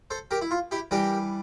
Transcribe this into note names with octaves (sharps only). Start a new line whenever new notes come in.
A4 C5
G4 A#4
E4
F4
E4 G4
E3 G3 D4 G4 A#4